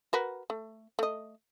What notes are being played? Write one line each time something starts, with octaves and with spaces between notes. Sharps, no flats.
F#4 A#4 B4
A3
A3 D#5